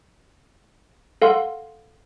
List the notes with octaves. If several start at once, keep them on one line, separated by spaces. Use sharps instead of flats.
A4 F5 F#5 C6